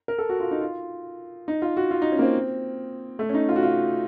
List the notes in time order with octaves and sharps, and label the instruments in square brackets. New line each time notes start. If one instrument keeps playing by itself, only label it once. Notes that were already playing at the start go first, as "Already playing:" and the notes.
[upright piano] A#4
A4
F#4
F4
D#4
F4
D#4
F4
F#4
F4
D#4
C#4
A#3
C4
A3
C#4
D#4
F4
F#4
F4